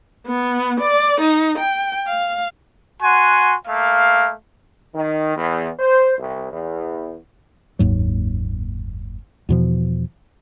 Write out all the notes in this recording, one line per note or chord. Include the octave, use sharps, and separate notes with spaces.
B3
D5
D#4
G5
F5
F#4 F#5 G#5 C6
A3 A#3 F5
D#3
E2
C5
C2
E2
F#1 D#2 G#2 F#3
E2 B2 F3